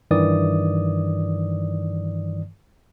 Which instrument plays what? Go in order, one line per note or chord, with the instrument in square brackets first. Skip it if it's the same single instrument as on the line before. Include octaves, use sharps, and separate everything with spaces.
[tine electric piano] G2 D#3 E3 D5 D#6